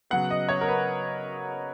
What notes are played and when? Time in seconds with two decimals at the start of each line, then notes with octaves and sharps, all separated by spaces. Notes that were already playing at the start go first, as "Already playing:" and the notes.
0.11 C#3 F#3 B3 F#5
0.30 D#5
0.48 C#5
0.61 A#4
0.68 B4